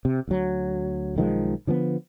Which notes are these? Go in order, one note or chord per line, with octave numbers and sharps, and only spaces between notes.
C3
D2 F#3
B1 D#3 F3 G#3
D3 F3 A3 B3